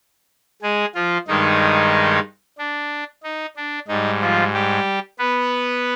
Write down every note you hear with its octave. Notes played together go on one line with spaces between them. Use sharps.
G#3 G#4
F3 F4
G2 D#3 G#3 D#4
D4
D#4
D4
G#2 G3 D#4
F3 F4
G3 G4
B3 B4